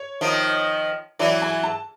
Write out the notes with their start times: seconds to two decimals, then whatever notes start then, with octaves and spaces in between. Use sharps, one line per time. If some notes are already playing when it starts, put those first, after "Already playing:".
Already playing: C#5
0.21 D#3 F3
1.19 E3 F#3 D5
1.42 G#5
1.63 A5